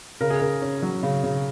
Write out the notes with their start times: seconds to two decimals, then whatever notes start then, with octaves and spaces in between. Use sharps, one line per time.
0.21 C#3 A#4
0.30 G#4
0.40 C#3 A#4
0.62 C#4
0.82 F#3
1.03 C#3
1.23 C#3